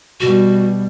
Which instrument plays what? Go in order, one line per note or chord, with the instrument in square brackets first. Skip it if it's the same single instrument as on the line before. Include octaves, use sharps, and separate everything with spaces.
[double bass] B2 G3 [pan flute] F#4